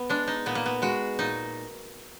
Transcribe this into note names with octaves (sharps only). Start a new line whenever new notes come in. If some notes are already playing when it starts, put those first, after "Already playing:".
Already playing: B3
G#3 D4
D#4
A#2 B3
A#3
B3
G#3 F#4
A#2 D#4